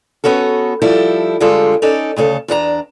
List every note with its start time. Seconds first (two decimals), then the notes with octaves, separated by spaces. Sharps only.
0.24 B3 C#4 F#4 A4
0.82 F3 G3 E4 A4
1.40 D3 G3 G#3 F4 G#4 A4
1.82 C#4 D#4 A4 D5
2.16 D2 C#3 C#4 A4
2.48 E2 D4 G#4 A#5